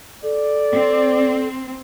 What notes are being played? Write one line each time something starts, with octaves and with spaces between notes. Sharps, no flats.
A4 D5
C4